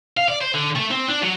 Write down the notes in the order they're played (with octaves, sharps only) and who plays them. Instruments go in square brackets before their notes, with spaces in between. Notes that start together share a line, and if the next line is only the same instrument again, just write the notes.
[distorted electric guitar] F5
D5
C5
D3
A3
C4
D4
F#3